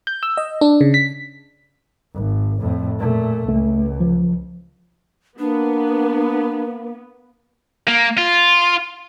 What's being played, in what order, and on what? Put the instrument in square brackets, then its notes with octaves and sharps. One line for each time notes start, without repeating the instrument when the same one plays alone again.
[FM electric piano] G6
E6
D#5
D4
C#3
B6
[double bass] G#1
F2 A2
A#2 A3
[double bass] C#2 [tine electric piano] A3
[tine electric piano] F3
[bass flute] A#3 [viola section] B3 [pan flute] D4
[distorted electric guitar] A#3
F4